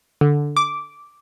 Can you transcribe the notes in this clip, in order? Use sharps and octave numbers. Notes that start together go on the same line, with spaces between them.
D3
D6